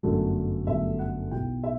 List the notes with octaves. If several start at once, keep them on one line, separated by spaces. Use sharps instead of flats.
G1 F#2 D3 F#3 A3
G1 F#2 D3 F#3 A3 E5
F#5
B1 B2 F#3 B3 E4 G5
E5